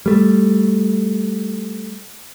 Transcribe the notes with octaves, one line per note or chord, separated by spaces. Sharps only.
G3 A3